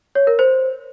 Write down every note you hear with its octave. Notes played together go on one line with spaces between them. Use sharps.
C#5
A#4
C5